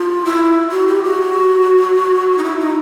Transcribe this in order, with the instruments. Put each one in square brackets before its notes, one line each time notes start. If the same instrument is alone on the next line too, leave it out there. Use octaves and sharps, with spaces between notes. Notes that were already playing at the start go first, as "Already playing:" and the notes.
Already playing: [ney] F4
E4
F#4
G4
F#4
D#4
E4
D#4